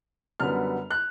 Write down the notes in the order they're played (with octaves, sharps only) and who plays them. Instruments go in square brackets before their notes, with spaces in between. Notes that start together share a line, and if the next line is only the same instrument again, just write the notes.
[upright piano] F#2 D3 G3 B3 F6
F#6